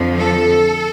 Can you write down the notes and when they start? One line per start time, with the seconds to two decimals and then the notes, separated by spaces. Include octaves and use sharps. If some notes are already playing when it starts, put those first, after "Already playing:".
Already playing: F2 D3 F3
0.19 A4